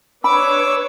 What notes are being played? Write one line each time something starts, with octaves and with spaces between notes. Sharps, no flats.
D4 B4 C#5 B5 D6 E6